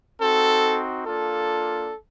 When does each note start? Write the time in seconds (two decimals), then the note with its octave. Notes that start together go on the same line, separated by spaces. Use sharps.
0.20 C4 D#4 F#4 A4
1.06 A#3 D4 F4 A4